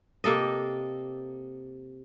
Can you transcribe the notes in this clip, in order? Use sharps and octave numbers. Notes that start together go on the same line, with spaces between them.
C3 A#3 A4 D#5